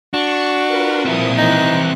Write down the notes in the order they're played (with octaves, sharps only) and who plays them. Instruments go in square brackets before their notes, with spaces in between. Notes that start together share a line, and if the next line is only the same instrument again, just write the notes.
[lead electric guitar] D4 [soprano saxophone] F#4 [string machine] C#6
[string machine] F4 A#4 B4
[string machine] A#2 F3 D#6 [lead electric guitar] C4 E4
[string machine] E3 F#6 [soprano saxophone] D#4